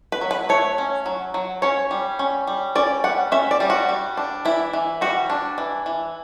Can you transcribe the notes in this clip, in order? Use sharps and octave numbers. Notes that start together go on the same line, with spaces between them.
B4
F#3
B4
A3 C#5
C#4
F#3
F#3
C#4 C#5
G3
C#4
G3
C#4 D5
G3 F#5
C#4 E5
D5
G3
F#4
G3
D4
E3 E4
E3
G3 F#4
D4
E3
E3